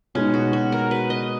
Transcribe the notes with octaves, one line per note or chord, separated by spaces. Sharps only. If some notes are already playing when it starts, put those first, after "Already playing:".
B2 G#3 C#4 D#4
F#4
F#4
A#4
B4
D#5